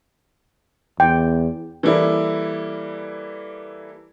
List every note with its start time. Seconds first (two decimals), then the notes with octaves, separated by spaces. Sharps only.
1.00 E2 G5
1.83 E3 G3 A#3 E4 A4 D5